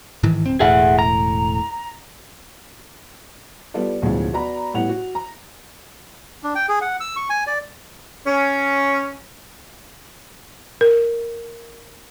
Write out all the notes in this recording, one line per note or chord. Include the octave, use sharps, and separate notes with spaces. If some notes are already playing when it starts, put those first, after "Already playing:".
G#2 D#3 E3
D1 C4
E1 A2 G#4 E5 F#5
A#5
G3 B3 F4 A4 D5
A1 D2 B2 E3 F3 G#3
B3 F#4 D5 A#5 B5
A2 G3 B3 F#5 F7
F#4
A#5
D4
G5
G#4
F#5
E6
C#6
G#5
D5
C#4
A#4